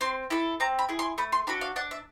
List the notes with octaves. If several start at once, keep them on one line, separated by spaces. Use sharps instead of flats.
C4 C6
E4 A4 B5
C4 A#5
B5
E4 G#4
C6
A3 B5
C6
D4 F#4 A4 B5
F5
D4 F#5
E5